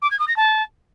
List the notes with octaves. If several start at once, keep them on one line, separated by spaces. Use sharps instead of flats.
D6
G#6
D#6
A#6
A5